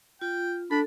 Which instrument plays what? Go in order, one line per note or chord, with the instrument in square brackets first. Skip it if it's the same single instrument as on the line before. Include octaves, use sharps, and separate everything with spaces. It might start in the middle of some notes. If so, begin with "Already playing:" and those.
[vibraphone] F4 [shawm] G5
[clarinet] D4 [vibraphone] A4 [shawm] B5